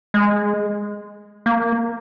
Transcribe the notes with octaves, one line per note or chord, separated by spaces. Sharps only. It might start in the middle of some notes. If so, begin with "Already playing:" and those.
G#3
A#3